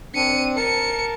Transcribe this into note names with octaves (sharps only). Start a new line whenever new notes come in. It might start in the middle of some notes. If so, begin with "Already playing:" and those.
C4 D4 C#7 D#7
A#4 A5 C#7